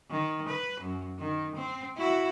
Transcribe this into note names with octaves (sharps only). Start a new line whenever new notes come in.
D#3
B4
F#2
D#3
C4
E4 F#4